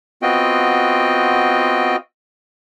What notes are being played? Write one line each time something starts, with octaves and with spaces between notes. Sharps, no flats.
B3 C4 F4 F#4 D#5 G5